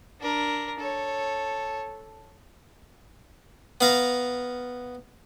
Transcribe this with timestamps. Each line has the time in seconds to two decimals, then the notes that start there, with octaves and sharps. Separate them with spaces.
0.20 D4 A#4
0.79 A4 C#5
3.81 B3 F5 A#5